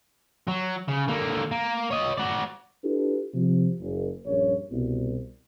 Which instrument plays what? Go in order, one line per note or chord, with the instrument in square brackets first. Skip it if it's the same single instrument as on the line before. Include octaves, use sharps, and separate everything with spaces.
[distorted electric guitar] F#3
C#3
D3 A#3
A#3
C#5 D#5
F#4 D5
[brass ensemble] D4 E4 F4 G4 A4 B4
C3 F3
F#1
A#1 G2 C#4 C#5
C2 B2